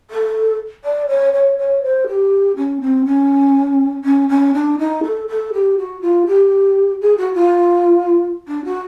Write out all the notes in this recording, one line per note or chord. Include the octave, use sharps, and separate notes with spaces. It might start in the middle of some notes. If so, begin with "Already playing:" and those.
A4
D5
C#5
C#5
C#5
C5
G4
C#4
C4
C#4
C#4
C#4
D4
D#4
A4
A4
G4
F#4
F4
G4
G#4
F#4
F4
D4
F#4